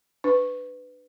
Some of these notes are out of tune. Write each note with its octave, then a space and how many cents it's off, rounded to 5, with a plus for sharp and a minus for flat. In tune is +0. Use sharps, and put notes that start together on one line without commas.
D4 +20 B4 +15